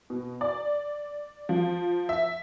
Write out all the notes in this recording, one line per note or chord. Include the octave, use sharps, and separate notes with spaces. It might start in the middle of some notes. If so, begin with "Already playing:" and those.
B2
D5
F3
E5